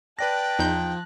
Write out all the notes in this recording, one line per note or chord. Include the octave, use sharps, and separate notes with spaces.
B4 D5 G5 A5 F#6 A#6
E2 F3 D#4 G6